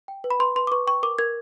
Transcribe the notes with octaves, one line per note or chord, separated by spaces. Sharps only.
G5
B4
B5
B4 C6
B4 C6
D6
B4 C#6
G5 C#6
A#4 D6
A#4 G#6